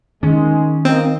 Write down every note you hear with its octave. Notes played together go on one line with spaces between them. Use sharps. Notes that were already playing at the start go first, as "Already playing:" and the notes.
D#3 G#3 C#4
A#3 C4 D#5